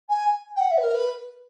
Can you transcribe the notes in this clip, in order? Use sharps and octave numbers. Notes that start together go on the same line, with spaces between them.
G#5
G5
F#5
E5
B4
A#4
B4